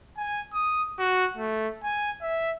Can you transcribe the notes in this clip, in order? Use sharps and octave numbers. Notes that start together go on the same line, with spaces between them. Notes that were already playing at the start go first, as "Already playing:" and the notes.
G#5
D#6
F#4
A3
G#5
E5